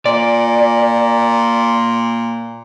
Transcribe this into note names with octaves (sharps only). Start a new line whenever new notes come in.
A#2 D5